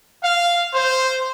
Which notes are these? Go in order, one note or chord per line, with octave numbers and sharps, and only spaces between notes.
F5
C5